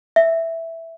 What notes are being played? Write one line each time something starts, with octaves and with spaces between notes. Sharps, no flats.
E5